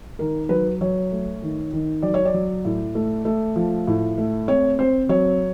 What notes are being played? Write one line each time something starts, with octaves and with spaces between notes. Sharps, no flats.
D#3 A#4
F#3 B4
F#3 C#5
A3
D#3
D#3
F#3 D5
C#5
D5
F#3
A2
A3
A3
F3
A2
A3
C4 C#5
C4 C5
F#3 C#5